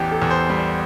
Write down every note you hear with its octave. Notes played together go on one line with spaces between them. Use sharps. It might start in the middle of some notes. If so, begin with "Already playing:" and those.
Already playing: A1 E2 G4
A4
E2
C5
G3